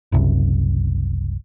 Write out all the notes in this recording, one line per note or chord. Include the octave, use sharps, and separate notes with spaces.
F#1 C2 F#2